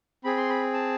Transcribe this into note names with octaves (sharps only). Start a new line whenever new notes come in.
C4 G#4 B5
C6
B5
A5